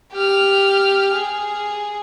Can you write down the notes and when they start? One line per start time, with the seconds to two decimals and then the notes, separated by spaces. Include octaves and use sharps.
0.13 G4 F6
1.13 G#4